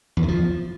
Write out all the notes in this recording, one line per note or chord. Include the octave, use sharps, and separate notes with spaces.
E2
D#3
F3